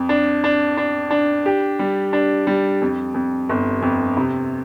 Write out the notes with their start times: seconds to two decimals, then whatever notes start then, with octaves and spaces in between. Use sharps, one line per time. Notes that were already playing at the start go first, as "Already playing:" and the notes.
Already playing: F2
0.09 D4
0.44 D4
0.77 D4
1.11 D4
1.46 G4
1.79 G3
2.13 D4
2.47 G3
2.82 F2
3.14 F2
3.49 G1
3.82 F2
4.17 C3